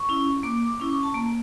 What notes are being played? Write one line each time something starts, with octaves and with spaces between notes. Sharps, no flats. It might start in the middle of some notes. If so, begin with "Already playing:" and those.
Already playing: C#6
C#4 E4
A#3 D6
D6
C#4 E4
C#6
A5
A#3 A#5